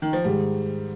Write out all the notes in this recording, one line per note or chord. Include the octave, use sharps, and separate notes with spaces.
D#3
F3
G#2 D#3 G3 G#3